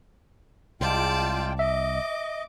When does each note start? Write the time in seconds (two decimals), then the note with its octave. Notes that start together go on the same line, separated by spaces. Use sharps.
0.81 C2 G#3 F4 D5 G5 A5
1.59 D#5 E5 D6